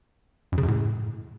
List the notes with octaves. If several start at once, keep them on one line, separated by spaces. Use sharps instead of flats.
F#2
C#3
F#2
A2